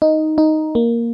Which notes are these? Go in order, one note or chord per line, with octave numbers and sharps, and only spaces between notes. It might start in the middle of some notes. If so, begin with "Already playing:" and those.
D#4
D#4
A#3